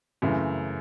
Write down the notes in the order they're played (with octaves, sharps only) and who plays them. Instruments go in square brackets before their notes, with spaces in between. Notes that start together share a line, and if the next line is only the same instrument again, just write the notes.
[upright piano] F#2 C#3 E3 A3